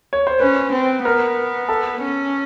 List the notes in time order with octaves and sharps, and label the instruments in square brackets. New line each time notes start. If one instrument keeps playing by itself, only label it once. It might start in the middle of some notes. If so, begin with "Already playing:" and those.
[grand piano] C#5
C5
[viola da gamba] C#4 [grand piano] B4
[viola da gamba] C4
[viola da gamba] B3 [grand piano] A#4
[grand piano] A4
[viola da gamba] C#4